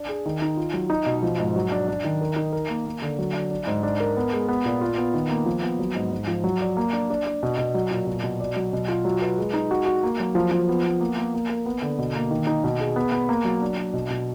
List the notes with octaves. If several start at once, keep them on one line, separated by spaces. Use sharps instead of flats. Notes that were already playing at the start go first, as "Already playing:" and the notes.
Already playing: D4
G#4
D#3
D#4
F4
F#3
D#4
B2
F3
G#2
F#3
D4
D4
D#3
A#4
D#4
A#4
A#3
A#3
D3
F#3
D4
D4
G#2
D4
A#4
B3
G#3
B3
A#2
F4
B3
D#3
A#3
F3
B3
F#3
G#2
G#2
F3
F#3
D5
A#3
D4
D4
D4
B2
B2
F#3
A#2
B2
B2
D5
F#3
B2
F4
F#3
B4
G#3
D#4
F#4
F#4
A#3
F#3
F3
F3
B3
B3
A#3
A#3
A#3
A#4
B3
D3
B2
A#3
D#3
D#4
B2
G#4
B3
B3
A#3
F#3
D4
D4
B2
B2